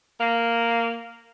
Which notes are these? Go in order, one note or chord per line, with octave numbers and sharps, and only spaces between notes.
A#3